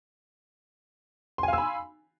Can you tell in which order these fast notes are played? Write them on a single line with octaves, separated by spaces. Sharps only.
C6 G#5 F5 E6 B5